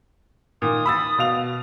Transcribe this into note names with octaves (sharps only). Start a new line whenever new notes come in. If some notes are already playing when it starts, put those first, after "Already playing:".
A#2 D#3 D#6
B5 E6 A6
B2 F5 F7